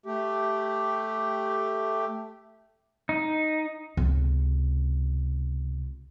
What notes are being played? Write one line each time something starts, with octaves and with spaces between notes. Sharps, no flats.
A3 G4
D#4
C#2 C3